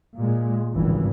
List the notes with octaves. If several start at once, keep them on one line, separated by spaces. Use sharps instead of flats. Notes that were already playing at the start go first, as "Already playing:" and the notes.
A#2 G#3
G#1 C#2 G2 E3